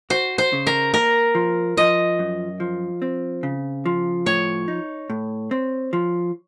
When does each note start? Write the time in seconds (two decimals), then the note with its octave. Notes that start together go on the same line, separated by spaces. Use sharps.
0.10 F#4 C5
0.38 C5
0.53 C#3
0.67 A#4
0.93 A#3 A#4
1.35 F3
1.77 F3 D#5
2.19 F#2
2.60 F3
3.02 C4
3.43 C#3
3.86 F3
4.26 A2 C#5
4.68 D#4
5.10 A2
5.51 C4
5.93 F3